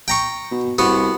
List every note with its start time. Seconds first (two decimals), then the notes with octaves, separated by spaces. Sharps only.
0.08 G5 A#5 C#6
0.51 B2
0.79 C2 B3 F#4